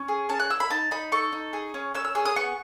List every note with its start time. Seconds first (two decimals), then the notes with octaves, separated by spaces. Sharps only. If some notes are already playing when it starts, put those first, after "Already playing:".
Already playing: C#4
0.08 G#4
0.29 C#4 A5
0.40 F#6
0.50 E4 E6
0.60 B5
0.70 D#4 A5
0.91 D#4 B5
1.12 A4 C#6
1.33 D#4
1.53 G#4
1.74 C#4
1.94 C#4 E6
2.05 E6
2.15 G#4 E6
2.26 D#6
2.36 B3 C#6